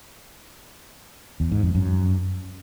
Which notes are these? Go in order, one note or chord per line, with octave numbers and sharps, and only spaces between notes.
E2
G#2
F2
F#2